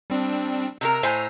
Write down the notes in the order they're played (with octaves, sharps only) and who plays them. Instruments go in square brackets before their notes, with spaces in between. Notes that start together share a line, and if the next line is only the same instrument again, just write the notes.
[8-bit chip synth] G3 C4 D4
[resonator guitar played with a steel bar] C3 D4 A#4 [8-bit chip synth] A#5 E6
[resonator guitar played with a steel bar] A2 C5 G#5